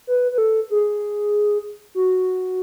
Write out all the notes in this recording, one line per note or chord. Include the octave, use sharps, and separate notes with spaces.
B4
B4
A4
G#4
F#4